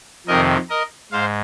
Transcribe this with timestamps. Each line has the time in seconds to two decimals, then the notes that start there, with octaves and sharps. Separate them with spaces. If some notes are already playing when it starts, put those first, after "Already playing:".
0.27 F2 C3 D#3 A#4 D#5
0.70 A#4 D#5
1.12 G#2 C5 F5